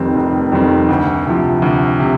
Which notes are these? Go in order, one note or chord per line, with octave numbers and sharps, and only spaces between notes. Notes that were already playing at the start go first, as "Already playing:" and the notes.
Already playing: F1 F2 D#3 G3 C4
F1
F2 D#3 G3 C4
D2
C3 F3
D2
C3